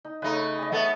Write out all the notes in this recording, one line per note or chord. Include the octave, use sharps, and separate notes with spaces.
D#4
C#3 A3 D#4 B4
G#4 D#5
A3 B3 A4